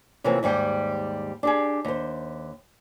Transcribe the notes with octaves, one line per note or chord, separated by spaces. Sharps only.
C3 E3 F3 A#3 C4 C#4
D#2 G#2 G3 F#5 G5
D4 G4 G#4
D#2 C5